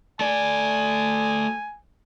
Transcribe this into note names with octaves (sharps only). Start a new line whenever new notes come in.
A3 D5 G#5